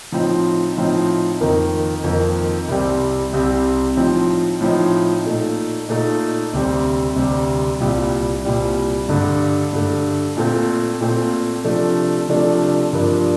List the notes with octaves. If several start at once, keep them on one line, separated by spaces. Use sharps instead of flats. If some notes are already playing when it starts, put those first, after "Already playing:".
A2 F3 C4 D#4
A2 F3 C4 D#4
F2 D#3 A#3 D#4
F2 D#3 A#3 D#4
C2 C3 G3 C4
C2 C3 G3 C4
A2 F3 C4 D#4
A2 F3 C4 D#4
A#2 A3 D#4
A#2 A3 D#4
D2 C3 G3 C4
D2 C3 G3 C4
C2 A#2 G3
C2 A#2 G3
G2 D3 A3
G2 D3 A3
A#2 A3 C4
A#2 A3 C4
C3 F3 A3 D4
C3 F3 A3 D4
G2 F3 A#3 D4